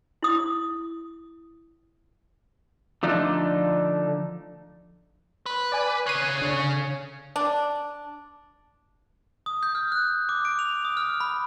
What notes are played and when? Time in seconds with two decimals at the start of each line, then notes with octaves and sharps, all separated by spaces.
0.23 E4 D#6
3.03 D3 F3 A3 D4 D#4
5.46 B4
5.72 D5 G#5 D6
6.07 C#3 C#5 F#6 C7 D#7
6.42 D3
7.36 D4
9.46 D#6
9.63 G6
9.75 F6
9.92 F#6
10.29 D6
10.45 D7
10.59 F7
10.85 D#6
10.97 F6
11.20 B5